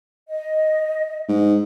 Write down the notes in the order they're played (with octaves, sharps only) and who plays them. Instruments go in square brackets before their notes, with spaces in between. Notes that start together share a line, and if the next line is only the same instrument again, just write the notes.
[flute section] D#5
[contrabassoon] G#2